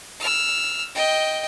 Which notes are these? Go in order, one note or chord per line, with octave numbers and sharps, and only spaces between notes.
E6 F6
D#5 G5